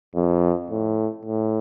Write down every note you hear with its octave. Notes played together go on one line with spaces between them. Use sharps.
F2
A2
A2